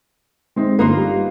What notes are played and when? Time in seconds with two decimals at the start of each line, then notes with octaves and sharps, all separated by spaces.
0.56 G#3 C4 D#4
0.79 G1 A#3 D#4 F4 B4
0.96 G3